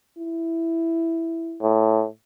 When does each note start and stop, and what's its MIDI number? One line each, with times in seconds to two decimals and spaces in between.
0.18 1.62 64
1.62 2.07 45